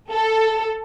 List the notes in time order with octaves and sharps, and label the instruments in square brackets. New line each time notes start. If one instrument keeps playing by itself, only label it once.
[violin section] A4